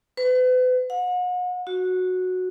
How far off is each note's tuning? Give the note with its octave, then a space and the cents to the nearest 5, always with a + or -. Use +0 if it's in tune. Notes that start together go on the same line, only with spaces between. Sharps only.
B4 +40
F#5 -40
F#4 -10